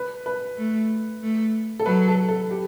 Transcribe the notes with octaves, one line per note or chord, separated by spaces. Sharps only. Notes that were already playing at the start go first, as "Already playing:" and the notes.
Already playing: B4
B4
A3
A3
A4
F#3 B4
A4
A4
G4